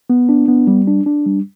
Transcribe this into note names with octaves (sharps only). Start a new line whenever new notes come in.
B3
D4
B3
G3
D4
D4
G3